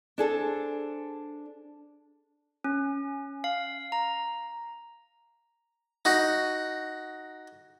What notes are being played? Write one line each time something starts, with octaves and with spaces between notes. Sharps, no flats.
D4 G#4 A4 C5
C#4
F5
A#5
D#4 F#4